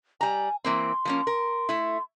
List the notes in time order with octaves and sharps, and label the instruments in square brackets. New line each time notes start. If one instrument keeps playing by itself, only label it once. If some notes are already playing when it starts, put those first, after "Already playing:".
[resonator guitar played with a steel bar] G3 A#5 [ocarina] G#5
[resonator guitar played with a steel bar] E3 A#3 C4 [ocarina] C6
[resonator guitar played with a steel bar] F3 A#3 C#4
A#4
A3 E4